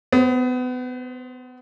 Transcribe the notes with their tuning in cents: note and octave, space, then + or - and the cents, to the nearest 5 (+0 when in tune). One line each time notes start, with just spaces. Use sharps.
B3 +30 C5 +0